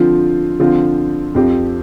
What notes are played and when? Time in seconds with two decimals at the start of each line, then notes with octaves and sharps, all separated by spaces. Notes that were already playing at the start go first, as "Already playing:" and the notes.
Already playing: D3 F3 C4 F4
0.60 D3 F3 C4 F4
1.35 F2 F3 C4 G4